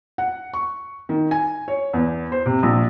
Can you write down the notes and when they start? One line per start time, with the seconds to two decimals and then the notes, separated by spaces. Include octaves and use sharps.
0.18 F#5
0.53 C#6
1.09 D#3
1.31 G#5
1.68 C#5
1.93 E2
2.32 C5
2.46 C3
2.63 A#1